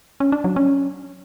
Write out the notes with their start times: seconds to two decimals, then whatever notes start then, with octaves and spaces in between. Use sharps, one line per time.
0.20 C#4
0.32 D4
0.44 F#3
0.56 C#4